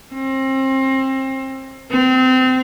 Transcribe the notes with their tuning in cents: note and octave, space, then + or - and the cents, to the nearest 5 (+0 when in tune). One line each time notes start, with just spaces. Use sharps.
C4 +30
C4 -25